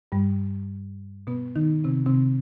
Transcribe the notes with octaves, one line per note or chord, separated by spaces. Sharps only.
G2 G3
B2 B3
D#3 D#4
C3 C4
C3 C4